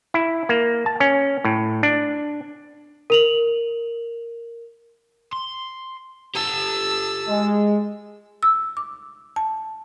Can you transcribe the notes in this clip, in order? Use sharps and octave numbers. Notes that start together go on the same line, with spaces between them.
E4
A#3
A5
C#4
A2
D4
A#4 F7 F#7
C6
G4 A4 A5 E6
G#3
E6
D6
A5